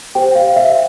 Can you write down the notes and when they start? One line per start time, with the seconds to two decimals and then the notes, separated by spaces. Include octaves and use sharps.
0.15 G4 C5 G5
0.35 F5
0.56 E5